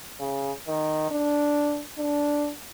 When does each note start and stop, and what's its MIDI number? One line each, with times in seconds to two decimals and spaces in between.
0.20 0.52 49
0.67 1.07 51
1.11 1.82 62
1.98 2.50 62